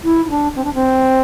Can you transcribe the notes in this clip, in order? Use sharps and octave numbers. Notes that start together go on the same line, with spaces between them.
E4
E4
D4
C4
D4
C4